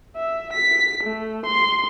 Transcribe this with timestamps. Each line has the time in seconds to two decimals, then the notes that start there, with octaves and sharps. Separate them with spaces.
0.16 E5
0.53 B6
1.03 A3
1.46 C6